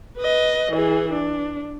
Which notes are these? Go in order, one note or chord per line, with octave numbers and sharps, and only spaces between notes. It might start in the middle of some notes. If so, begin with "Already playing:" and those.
B4 D#5
E3 G#4
D4